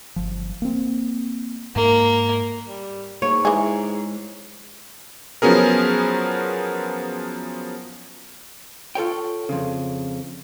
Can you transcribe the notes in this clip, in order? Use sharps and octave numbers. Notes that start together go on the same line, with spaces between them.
G1 F3
A#3 C4
G#2 A#3
G3
G#2 A#3 C#5
E3 G#3 G#4
F3 F#3 B3 C#4 G#4 A#4
F4 A4 C#5 G5
F2 C#3